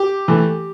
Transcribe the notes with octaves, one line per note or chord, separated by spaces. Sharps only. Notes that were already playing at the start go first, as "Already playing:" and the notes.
Already playing: G4
E3 A3